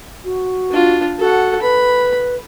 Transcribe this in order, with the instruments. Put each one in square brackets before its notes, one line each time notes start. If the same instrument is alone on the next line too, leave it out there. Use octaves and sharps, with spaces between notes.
[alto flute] F#4
[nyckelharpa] D4 F4
[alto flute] F#4 [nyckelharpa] A4 F#5
[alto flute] B4 [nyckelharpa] B5